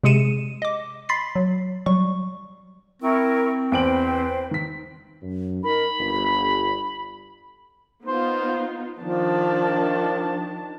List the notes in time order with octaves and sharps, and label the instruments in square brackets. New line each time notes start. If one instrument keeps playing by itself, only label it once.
[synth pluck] C3 G#3 G#4 C#7 D#7 E7
D#5 D6
B5 C6 A6 B6 C7
F#3
F#3 G3 C#6
[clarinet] C4 [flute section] E4 A#4 C#6
[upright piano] E2 D7 F#7 [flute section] B4 C5 G5
[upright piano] D#3 B6
[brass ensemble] F#2
[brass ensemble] D#4 A#4 [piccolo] B5
[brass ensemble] G1
[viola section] B3 D#4 F4 [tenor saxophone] C5
[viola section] D#3 D4 A5 [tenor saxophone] F3